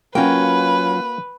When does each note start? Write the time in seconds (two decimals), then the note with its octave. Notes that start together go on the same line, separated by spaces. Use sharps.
0.15 F#3 A#3 C#4 F4 F#4 B4 G5 G#5